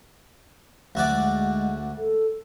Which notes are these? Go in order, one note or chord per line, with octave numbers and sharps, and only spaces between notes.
D2 F3 F#4 D5
G#3
A4